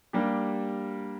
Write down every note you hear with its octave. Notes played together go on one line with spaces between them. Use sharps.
G3 A#3 D4 G4